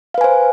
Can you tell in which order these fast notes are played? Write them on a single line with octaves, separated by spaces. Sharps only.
F5 B4 G#5 C5